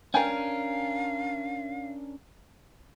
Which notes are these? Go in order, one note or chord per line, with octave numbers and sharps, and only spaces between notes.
C#4 D4 A#4 F5 G5 G#5